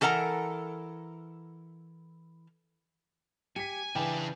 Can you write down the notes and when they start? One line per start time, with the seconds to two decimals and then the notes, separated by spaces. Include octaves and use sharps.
0.01 E3 A4 A#4 F#5 A#5
3.56 G4 G#5 B6 C#7
3.95 C#3 E3 D4 B4 G5 G#5